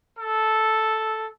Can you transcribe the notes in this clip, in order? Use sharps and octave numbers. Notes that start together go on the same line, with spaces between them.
A4